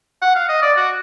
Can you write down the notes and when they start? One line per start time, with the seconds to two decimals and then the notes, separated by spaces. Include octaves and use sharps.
0.22 F#5
0.35 F5
0.49 D#5
0.62 D5
0.76 F#4